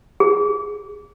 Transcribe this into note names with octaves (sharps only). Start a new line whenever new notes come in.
G#4